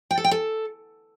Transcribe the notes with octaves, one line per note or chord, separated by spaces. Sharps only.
G5
A4
G5
A4